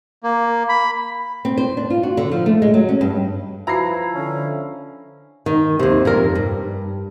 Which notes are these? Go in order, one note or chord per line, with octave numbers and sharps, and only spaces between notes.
A#3
B5
C4
C5
D4
F4
F#4
D3
F3
A3
G#3
F#3
C#4
G2
F3 E4 B4 A#5 A#6 C7
D3 C#4
D#3
D#2 C3
F2 A#2 A#4
G2